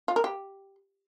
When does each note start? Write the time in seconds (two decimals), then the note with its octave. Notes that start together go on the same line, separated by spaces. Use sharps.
0.08 F4
0.16 A#4
0.24 G4